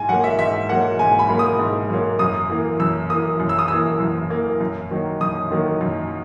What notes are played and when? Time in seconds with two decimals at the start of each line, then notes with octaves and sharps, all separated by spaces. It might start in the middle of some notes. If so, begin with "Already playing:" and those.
Already playing: G#2 G#5
0.09 F#3 A#3 F#5
0.24 E5
0.39 G#2 E5
0.69 F#3 A#3 F#5
0.99 G#2 G#5
1.19 B5
1.29 F#3 A#3
1.39 D#6
1.59 G#2
1.89 F#3 A#3
2.19 F#2 D#6
2.50 E3 A#3
2.80 F#2 E6
3.09 E3 A#3 D#6
3.40 F#2
3.49 E6
3.59 D#6
3.68 E3 A#3 E6
4.00 F#2
4.30 E3 A#3
4.61 F#2
4.91 D#3 F#3 A#3
5.21 F#2 D#6
5.51 D#3 F#3 A#3
5.81 F#2